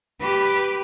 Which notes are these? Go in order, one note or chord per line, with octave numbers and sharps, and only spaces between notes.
G4 B4